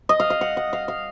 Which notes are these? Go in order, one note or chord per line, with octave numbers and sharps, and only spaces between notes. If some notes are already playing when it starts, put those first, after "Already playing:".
D#5
F5
F5
F#5
F#5
F5
F5